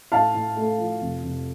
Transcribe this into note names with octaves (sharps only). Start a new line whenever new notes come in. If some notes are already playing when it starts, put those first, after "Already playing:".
A2 F5 A5
A2
A3
F3
F1
F1